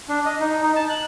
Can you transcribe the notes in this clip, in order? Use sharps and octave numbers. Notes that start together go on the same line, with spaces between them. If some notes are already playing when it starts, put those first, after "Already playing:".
D4
D#5
D#4
D#4
A5
F#6